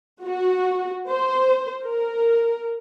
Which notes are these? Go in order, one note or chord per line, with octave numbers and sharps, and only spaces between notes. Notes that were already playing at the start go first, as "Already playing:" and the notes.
F#4
C5
A#4